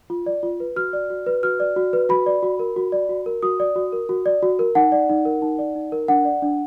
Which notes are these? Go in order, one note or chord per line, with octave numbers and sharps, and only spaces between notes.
F4
D5
F4
B4
F#4 F6
D5
F#4
B4
F#4 F6
D5
F#4
B4
F#4 B5
D5
F#4
A#4
F#4
D5
F#4
A#4
F#4 D#6
D5
F#4
A#4
F#4
D5
F#4
A#4
D#4 F#5
D5
D#4
A#4
D#4
D5
D#4
A#4
D4 F#5
D5
D4